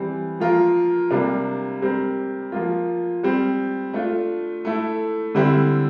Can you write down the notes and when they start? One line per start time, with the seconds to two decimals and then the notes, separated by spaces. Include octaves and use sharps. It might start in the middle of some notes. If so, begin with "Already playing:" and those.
Already playing: E3 G3 C4
0.40 F3 A#3 F4 A#4
1.11 C3 G3 A#3 D4
1.82 G3 C4 G4 A#4
2.52 F3 A#3 F4
3.23 G3 C4 G4
3.93 A3 D4 F4
4.65 A3 E4 A4
5.35 D3 G3 C4 E4